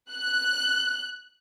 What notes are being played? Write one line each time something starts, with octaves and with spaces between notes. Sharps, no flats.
F#6